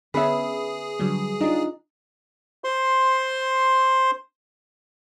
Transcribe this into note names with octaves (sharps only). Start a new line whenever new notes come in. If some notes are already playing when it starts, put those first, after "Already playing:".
D3 B3 C#4 G#4 B4 E5
D3 F#3 G3
D4 D#4 F4
C5 C6